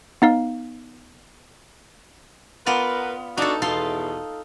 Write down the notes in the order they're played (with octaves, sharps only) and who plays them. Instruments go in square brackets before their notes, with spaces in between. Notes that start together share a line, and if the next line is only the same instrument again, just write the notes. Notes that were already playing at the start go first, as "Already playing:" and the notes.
[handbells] B3 D#4 F5
[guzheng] B3 F4 D5 [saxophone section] A#4 B4
[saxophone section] D4 F#4 [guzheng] D#4 A4
[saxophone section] E2 B2 [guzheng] F4 A4 C6